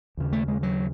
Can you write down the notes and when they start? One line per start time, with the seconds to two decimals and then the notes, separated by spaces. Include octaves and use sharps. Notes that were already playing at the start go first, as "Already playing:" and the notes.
0.17 D#2 C#3
0.33 A3
0.48 G#3
0.63 F#3